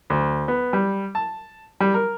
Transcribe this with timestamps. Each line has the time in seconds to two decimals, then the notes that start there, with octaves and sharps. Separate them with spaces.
0.10 D2
0.48 B3
0.73 G3
1.15 A5
1.80 G3
1.94 A#4